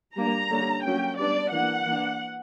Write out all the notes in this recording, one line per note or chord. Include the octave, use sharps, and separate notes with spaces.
G3 A#3 D4 A#5
D3 G3 A#3 C#4
F#3 A#3 C#4 G5
G3 B3 D4 D5
E3 A#3 D4 F#5
E3 A#3 D4